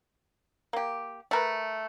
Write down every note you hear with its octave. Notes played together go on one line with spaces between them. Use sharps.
A#3 G4
A3 A#4 B4